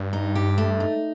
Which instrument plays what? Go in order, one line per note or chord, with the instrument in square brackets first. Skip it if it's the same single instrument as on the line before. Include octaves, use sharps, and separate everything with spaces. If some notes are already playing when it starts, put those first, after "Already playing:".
Already playing: [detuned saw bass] G2
[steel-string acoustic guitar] D#4
G4
A3
D#4